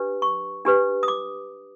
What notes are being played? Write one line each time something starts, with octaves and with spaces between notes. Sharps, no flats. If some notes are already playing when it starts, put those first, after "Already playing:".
Already playing: D4 G4 B4
C#6
D4 G4 B4
D#6
D6